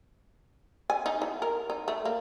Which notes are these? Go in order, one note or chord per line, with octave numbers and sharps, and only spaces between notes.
G#5
D#4
E3
A#4
D#4
A3
A#3